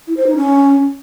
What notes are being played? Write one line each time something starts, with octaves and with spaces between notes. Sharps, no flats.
E4
C5
D#4
C#4